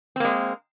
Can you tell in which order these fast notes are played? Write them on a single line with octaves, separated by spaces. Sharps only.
C4 A#3 G#3